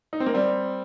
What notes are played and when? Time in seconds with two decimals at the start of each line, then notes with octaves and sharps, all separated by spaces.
0.13 D#4
0.20 C4
0.26 A#3
0.34 G3 C4